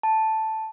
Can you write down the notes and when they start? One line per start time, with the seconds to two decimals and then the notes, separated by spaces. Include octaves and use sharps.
0.03 A5